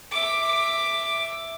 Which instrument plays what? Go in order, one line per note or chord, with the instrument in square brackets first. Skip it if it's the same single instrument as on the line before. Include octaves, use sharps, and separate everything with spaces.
[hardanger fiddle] E5 D6